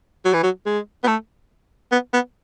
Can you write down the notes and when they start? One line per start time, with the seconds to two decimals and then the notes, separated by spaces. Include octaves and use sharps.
0.25 F#3
0.34 E3
0.43 F#3
0.66 G#3
1.03 B3
1.07 A3
1.92 B3
2.13 B3